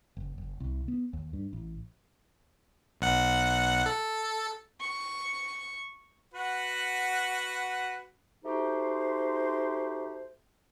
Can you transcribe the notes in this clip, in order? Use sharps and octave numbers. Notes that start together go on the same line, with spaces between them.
F#1
F#1
C2
B3
D#2
G2
A1
B1 F#5
A4
C#6
F#4 B4 F#5
A3 D#4 F#4 G4 C5